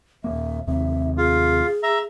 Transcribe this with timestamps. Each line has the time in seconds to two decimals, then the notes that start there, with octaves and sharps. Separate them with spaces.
0.24 D#1 F#2 A#3 E5
0.67 D#2 A2 C3 E5
1.17 F4 G#4
1.83 E5 A#5